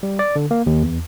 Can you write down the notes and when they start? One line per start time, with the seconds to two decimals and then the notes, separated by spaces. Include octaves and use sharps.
0.03 G3
0.19 D5
0.36 D3
0.51 A#3
0.66 D#2
0.83 E2